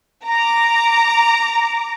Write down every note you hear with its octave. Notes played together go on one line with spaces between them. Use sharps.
A#5 D6